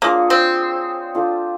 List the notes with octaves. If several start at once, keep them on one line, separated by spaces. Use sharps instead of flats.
A#3 D4 F4 G#4 C#5
C4
D4 F4 A4